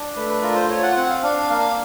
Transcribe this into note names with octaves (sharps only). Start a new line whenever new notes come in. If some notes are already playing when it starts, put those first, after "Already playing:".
Already playing: D4
A3 B4
B4
F4 A#4
C5
F4 C#5
F#5
C4 F#5
F5
D4 F5
A#3 F5